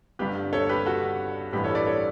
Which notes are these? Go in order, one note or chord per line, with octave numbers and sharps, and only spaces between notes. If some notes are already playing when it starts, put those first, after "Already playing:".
G1 G2 D3 G4 B4
A4 C#5
G4 B4
F#4 A4
A1 G2 E3 G4 B4
A4 C#5
B4 D5
A4 C#5